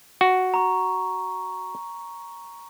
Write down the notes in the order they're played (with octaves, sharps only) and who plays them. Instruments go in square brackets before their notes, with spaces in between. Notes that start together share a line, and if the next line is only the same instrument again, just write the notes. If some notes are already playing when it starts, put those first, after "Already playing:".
[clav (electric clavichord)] F#4
[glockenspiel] A#5 C#6